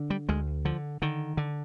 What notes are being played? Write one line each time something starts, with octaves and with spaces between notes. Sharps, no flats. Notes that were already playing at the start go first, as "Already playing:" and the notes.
Already playing: D3
G3
D2 G#3
D3 F3
D3 D#3
D3